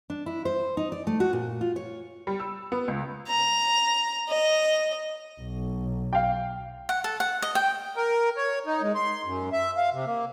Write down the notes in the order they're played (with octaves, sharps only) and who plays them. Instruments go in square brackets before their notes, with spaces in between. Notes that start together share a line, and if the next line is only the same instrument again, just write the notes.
[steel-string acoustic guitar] D4
E4
C5
D#4
D5
A3
F#4
A#2
F4
C#5
[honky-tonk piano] G3
E6
B3
C#2
[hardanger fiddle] A#5
D#5
[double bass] B1
[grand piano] F5 G5
[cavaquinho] F#5
A4
F#5
D#5
G5
[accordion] A#4
C#5
D#4
G#3
C6
F#2
E5
F5
C3
A#3